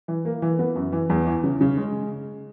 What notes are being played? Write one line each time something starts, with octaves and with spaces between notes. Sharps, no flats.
E3
A#3
E3
B3
F#2
E3
E2
E3
C#3
C#3
G#3